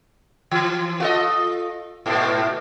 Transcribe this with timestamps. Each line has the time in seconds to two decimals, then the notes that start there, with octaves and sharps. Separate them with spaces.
0.51 E3
1.00 F4 A4 D#5
2.06 G#2 B2 A3